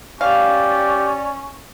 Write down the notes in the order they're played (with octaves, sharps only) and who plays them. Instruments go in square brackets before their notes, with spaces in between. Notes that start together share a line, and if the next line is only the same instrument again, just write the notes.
[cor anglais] C#4 [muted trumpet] G4 [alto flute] D5 [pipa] F5